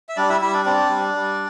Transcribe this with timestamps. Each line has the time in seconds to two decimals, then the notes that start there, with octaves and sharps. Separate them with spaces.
0.09 E5
0.17 G3 D4 D5
0.29 E4 E5
0.41 G3 E4 E5
0.53 D4 D5
0.65 C4 D4 D5
0.89 G3
1.14 G3